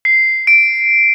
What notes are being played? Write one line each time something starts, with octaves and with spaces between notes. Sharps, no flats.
C7
D7